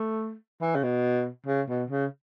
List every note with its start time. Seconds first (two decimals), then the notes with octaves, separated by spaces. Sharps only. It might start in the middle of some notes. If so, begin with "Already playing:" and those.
Already playing: A3
0.61 E3
0.75 C#3
0.83 B2
1.46 C#3
1.68 B2
1.90 C#3